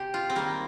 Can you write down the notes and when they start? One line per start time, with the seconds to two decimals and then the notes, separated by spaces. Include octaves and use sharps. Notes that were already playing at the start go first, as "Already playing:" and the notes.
Already playing: C3 G4
0.14 F4
0.30 C4
0.36 D#3 G3 A#3